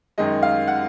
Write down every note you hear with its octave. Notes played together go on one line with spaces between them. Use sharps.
F#2 D#3 G#3 D#5
F5
F#5